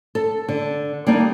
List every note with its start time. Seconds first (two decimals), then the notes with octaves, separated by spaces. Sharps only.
0.15 A4
0.48 D3
1.07 G3 A#3 D4 D#4